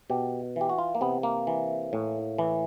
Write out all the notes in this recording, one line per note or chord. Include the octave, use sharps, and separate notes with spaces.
B2 G4
E3 G4
F#4
F4
A#3
C3 B3
A#3
E3
A2
E3